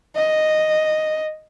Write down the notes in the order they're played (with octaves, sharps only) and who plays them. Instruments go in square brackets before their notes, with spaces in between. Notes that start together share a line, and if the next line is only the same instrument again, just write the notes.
[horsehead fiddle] D#5